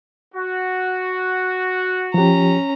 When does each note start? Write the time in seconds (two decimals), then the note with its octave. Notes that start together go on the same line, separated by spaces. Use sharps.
0.34 F#4
2.14 F3 C#4 G4 A#5